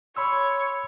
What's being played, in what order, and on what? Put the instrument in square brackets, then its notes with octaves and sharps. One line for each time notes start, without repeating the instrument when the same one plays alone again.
[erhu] C#5 [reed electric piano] B5 C6 E6